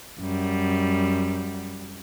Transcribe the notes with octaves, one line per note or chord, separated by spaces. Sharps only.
F#2 G3